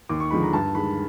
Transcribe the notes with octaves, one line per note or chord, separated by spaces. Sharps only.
D#2 D6
C#6
D3 F3 G#3 B5
A#5
G2 A5
D#3 G#3 B5